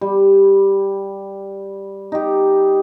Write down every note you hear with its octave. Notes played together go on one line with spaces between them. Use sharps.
G3
D#4 G4